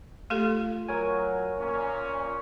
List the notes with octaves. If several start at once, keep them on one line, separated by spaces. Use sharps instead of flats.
A3 F4 G4 A4
F#3 A#4 C#5 G#5
A#2 C#4